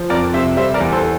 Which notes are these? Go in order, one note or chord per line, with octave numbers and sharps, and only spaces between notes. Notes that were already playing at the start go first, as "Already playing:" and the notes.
Already playing: F3
F2 A#4 D5
C3 C5 E5
G3 C5 E5
A#4 D5
E2
A4 C5